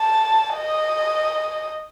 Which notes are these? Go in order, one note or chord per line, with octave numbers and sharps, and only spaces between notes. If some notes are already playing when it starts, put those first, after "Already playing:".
Already playing: A5
D#5